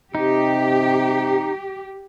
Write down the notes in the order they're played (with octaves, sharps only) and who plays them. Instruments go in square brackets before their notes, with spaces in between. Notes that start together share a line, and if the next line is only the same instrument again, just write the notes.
[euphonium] C3 [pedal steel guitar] D#4 [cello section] G4